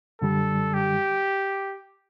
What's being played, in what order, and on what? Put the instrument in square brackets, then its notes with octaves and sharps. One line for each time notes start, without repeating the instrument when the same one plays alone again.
[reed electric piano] F#2 D3 G3 [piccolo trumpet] A4
[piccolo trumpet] G4